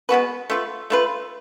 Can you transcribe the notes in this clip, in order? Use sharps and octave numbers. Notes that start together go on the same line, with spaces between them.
G#3 B3 F#4 B4
A3 F4 B4
A3 F4 B4